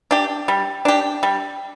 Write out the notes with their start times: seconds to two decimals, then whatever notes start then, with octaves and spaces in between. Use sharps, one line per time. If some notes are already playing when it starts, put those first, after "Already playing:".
0.11 D4 G4
0.48 G3
0.85 D4 G4
1.23 G3